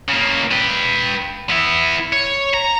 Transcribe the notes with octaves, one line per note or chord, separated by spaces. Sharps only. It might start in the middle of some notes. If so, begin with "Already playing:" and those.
C#3 A#3
B4 G5
B3 E4
C#5
A#5